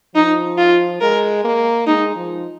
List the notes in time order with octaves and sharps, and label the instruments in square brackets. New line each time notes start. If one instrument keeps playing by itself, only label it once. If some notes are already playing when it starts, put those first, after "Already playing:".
[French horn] F3 [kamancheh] D#4
[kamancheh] F4
[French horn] G#3 [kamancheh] A#4
[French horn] A#3
[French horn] G#3 [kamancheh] D#4
[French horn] F3